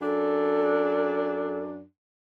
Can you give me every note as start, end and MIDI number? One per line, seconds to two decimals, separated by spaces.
0.01 1.83 42
0.01 1.83 62
0.01 1.60 69